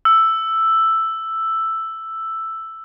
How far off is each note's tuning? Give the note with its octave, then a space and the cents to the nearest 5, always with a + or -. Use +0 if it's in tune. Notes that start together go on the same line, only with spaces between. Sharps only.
E6 +5